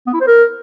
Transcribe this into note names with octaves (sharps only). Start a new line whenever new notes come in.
B3
E4
C5
A#4